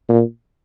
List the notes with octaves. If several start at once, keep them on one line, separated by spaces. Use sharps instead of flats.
A#2